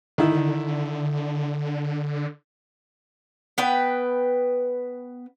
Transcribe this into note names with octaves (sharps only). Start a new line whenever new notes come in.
D3 D#3 E4
B3 B4 G5